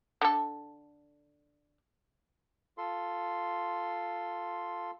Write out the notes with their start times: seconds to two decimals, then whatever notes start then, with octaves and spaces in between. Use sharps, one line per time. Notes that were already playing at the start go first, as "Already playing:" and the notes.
0.22 D3 A4
2.78 F4 A4 C6